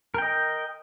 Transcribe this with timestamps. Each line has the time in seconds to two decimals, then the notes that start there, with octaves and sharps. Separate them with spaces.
0.14 A#4
0.18 G5
0.22 D#5